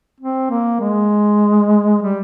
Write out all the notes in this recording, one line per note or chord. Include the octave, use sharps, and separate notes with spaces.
C4
A#3
G#3
G3